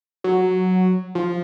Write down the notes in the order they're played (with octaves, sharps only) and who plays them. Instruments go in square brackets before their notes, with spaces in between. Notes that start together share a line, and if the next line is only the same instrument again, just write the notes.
[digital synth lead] F#3
F3